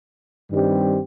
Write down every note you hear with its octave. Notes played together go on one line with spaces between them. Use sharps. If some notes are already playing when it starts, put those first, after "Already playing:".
G2 D#3 G3 C4 G4